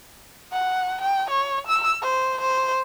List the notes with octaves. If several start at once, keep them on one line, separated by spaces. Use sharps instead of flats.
F#5
G5
C#5
E6
C5
C5